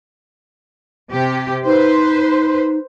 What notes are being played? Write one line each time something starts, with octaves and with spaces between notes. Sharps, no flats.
C3 G4
D#4 B4 C5